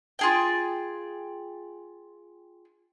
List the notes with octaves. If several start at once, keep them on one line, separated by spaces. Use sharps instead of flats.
F4 G#4 G5